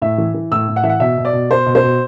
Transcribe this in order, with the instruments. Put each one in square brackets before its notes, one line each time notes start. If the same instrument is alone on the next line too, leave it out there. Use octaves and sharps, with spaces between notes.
[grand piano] A2 E5
E3
E3
A2 E6
A2
F#5
E3 E5
F#5
B2 E5
B2
D5
B2
B2 C5
B2
C5
B2